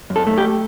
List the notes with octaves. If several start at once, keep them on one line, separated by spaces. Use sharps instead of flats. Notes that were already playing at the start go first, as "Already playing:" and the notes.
F#2
A4
A3
G4